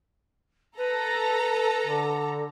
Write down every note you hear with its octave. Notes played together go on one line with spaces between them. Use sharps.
A4 B4 A#5
D3